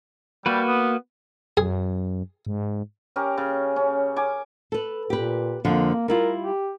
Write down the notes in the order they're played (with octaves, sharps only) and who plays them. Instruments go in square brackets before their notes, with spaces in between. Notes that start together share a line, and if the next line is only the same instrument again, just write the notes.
[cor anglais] G3 [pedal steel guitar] A#3 F#4 B4
[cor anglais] B3
[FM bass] F#2 [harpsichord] G#4
[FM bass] G#2
[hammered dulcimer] C#4 G4 A#4
C#3
C#4
G#5 D6
[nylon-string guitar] A4 B4
[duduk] A#2 [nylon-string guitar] G4 B4
[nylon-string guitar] F2 D3 F3 [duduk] A#3
[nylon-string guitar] G3 E4 F4 [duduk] A#4
[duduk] G4